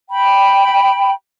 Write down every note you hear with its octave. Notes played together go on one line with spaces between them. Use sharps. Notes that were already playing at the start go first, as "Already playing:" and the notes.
G5 B5